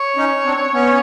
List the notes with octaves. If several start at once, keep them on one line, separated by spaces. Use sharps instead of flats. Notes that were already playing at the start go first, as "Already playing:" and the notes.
Already playing: C#5
C#4 D#4
C4 D4
B3 C#4